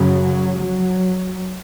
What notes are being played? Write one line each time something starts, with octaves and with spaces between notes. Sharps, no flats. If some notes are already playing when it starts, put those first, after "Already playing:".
Already playing: F#2 C#3 F#3
F#3